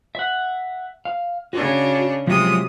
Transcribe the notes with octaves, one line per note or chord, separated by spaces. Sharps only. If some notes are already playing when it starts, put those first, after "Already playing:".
E5 F#5
F5
C#3 D4 F#4
C3 F3 F#3 G#3 D#6